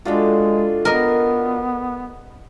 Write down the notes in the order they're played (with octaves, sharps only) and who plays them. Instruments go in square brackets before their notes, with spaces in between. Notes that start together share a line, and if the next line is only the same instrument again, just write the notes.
[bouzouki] A2 G3 A4 [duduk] G#3 [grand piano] D4 F4 F#4
[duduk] B3 [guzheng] A#4 D#5